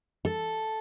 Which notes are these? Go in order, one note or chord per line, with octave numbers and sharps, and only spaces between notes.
A4